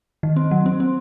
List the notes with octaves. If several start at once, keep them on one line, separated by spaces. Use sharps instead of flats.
D#3
C4
F#3
C4
C4